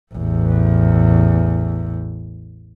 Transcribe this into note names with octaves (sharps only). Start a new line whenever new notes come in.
A1 E2